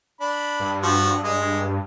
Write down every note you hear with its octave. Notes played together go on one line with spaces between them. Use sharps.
D4 B5
G2
F3 F#4 C5
G#3 D#5